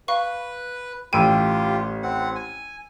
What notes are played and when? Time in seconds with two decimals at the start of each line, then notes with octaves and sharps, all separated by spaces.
0.08 B4 F5 C#6
1.13 A1 F4 G4 G5 E6 D#7
2.03 C4 F#5
2.35 G#5